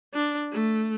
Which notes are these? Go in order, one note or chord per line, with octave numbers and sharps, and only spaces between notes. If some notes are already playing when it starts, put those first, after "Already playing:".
D4
A3